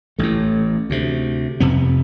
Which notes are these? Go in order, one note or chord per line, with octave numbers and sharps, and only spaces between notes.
A1 A2 A3
D2 C3
F1 F2 C3 B3